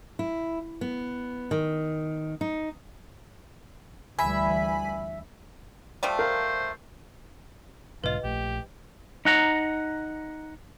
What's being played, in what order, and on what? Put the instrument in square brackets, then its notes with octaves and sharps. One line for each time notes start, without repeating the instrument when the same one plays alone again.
[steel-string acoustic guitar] E4
B3
D#3
D#4
[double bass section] D2 E3 G3 [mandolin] E5 [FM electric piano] G#5 B5 B6
[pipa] F3 G3 A3
[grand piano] A#4 F5 [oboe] C5
[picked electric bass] B1 G#2 D3 [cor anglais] F4 [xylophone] B4 D#5
[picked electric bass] A#1 A3 [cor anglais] G4
[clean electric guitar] D#4 F#5 A#5